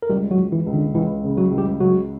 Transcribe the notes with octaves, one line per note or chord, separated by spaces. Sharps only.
A#4
C#2 G3 G4
F#3 F#4
C#2
E3 E4
C#2
D3 D4
C#2 E3 E4
C#3
F#3 F#4
C#2
G3 G4
C#3 F#3 F#4